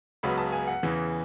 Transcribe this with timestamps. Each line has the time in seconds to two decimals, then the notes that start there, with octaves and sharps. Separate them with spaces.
0.23 C#2 C#3 F#3 B3 B5
0.38 A5
0.52 G#5
0.67 F#5
0.83 E2 C#3 E3